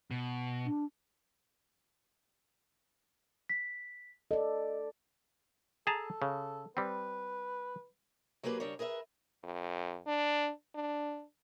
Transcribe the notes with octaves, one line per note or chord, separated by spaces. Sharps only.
B2
D4
B6
A4 D5 D#5
G#4 A4 A5 A#5
C#3
G3 C4 B4
F#3 A#3 G4 G#4 B4
C#3 G3 D4 A#4 C#5
G#4 A#4 B4 D#5 E5
F2
D4
D4